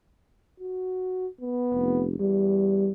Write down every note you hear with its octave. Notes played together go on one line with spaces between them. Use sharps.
F#4
B3
F1
E2 G3